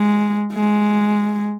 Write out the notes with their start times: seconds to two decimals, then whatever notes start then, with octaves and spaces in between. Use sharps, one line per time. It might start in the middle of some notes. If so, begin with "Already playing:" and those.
Already playing: G#3
0.54 G#3